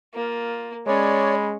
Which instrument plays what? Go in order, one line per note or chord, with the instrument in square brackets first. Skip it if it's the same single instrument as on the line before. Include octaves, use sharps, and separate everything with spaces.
[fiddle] A#3 [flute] F4
[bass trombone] G#3 [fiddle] C#4 [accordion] C#5 D5 [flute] B5